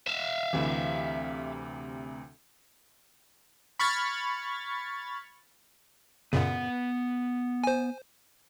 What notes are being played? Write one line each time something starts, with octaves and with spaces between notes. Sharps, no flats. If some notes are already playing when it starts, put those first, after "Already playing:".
E5 F5
D2 C3 E3
B5 C#6 F6 G#6 A6
F#2 A#2 C#3 B3 F#5
C5 G#5